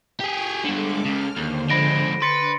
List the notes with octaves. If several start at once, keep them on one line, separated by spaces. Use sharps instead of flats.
G4 G#4 G#5 C#6
G2 D3 G#3 A4 D6
C#2 C#3 F6
D#2 D3 C5
F3 G#3 B5 A#6 D7
D4 B4 C6 A6 C#7